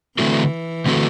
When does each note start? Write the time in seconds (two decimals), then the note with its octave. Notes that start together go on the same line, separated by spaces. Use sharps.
0.18 D3 E3 A3 C4 F#4 A4
0.86 D3 A3 C4 F#4 A4